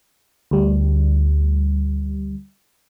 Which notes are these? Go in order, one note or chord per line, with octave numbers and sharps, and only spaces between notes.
D2 G3